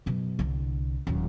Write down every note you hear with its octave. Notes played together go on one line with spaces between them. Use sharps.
F#2 B2
C2 D3
D#1 B1